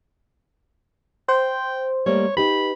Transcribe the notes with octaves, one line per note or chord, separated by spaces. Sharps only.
C5 G5
G3 A3 A#3 C#5
D#4 G4 B4 B5